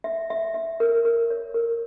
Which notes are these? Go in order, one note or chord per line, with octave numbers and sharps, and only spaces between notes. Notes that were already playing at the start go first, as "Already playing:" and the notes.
E5
E5
E5
A#4
A#4
C#5
A#4